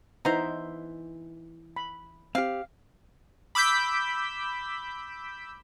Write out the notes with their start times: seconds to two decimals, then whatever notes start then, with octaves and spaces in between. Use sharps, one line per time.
0.25 E3 B3 D#4 C5 E5 A#5
1.76 B5
2.35 C4 G4 F5
3.55 B5 D6 E6 G6 B6